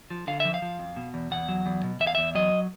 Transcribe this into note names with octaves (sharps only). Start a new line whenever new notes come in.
F3
D3 F5
E5
F3
F5
F3
F2
B2
E2
E2 F#5
F#3
E2
B2
E2 E5
F5
E2 E5
F#3 D#5